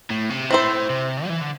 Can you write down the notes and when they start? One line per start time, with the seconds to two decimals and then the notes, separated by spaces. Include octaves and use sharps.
0.11 A2
0.30 C3
0.51 A2 C4 E4 C5
0.90 C3
1.25 G3
1.29 E3
1.41 D3